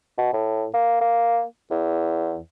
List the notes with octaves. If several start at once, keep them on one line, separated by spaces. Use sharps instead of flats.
B2
A2
A#3
A#3
E2